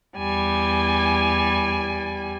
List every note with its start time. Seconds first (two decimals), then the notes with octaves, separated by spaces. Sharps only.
0.17 E2 G3 G#5